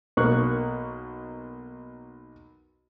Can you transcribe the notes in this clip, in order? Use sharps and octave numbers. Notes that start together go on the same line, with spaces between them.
B1 A#3 C#6 F#6